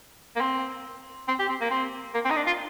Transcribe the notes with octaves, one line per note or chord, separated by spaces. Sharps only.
A#3
C4
C4
G4
C4
A#3
C4
A#3
C4
D#4
D4
F4